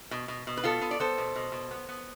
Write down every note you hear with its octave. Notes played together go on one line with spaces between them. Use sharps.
B2
B2
B2
B4
B3 F4 A4
B3
D5
B3 A4 C5
B2
B2
B2
B3
B3